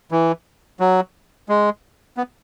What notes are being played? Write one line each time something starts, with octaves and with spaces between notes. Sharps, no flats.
E3
F#3
G#3
B3